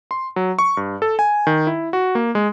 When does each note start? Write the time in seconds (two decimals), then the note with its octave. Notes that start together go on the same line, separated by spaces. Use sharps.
0.11 C6
0.36 F#3
0.59 C#6
0.77 G2
1.02 A4
1.19 G#5
1.47 D#3
1.67 E4
1.93 F#4
2.15 A#3
2.35 G#3